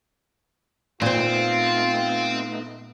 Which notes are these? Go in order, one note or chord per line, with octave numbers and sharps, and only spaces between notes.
A#2 A3 B3 C4 D#4 F4 C5